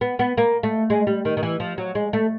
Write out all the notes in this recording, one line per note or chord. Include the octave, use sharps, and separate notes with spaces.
B3
B3
A#3
A3
G#3
G3
D#3
D#3
E3
F3
F#3
G#3
A3